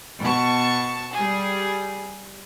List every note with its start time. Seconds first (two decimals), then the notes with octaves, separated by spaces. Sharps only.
0.24 B2 A5 C#6
1.14 G3 G#4